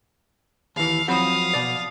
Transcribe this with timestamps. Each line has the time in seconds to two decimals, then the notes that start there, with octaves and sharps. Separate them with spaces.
0.76 D#2 E3 F5
1.08 F3 F#3 C4 F5 F#5 B5 D#6 E7
1.54 B2 D5